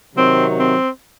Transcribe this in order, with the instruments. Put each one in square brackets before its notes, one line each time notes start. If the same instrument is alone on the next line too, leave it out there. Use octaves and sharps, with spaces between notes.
[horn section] C3 D#3 F#3 C4
C4